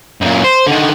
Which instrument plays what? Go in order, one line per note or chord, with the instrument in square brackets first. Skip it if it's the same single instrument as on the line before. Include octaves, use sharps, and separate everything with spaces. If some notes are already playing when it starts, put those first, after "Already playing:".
[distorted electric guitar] F#2 A#2
C5
D3 D#3